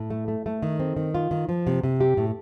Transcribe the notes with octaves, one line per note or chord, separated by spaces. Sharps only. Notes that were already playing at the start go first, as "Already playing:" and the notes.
Already playing: A2
A3
A3
A3
D#3
C4
D#3
F4
D#3
F3
C3
C3
G4
A2